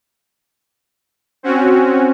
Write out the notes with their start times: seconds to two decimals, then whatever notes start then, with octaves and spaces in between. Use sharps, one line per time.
1.43 C4 C#4 F#4